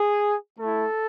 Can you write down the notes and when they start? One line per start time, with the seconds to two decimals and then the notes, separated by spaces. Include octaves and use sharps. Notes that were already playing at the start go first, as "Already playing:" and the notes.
Already playing: G#4
0.58 A3 E4 A4